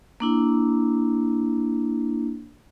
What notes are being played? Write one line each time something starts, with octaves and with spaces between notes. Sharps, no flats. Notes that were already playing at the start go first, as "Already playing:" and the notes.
A#3 D4 E4